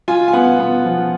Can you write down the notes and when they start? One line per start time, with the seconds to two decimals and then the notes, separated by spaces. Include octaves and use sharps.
0.08 F4 G#5
0.28 G#5
0.33 B3 F#5
0.59 B3
0.85 F3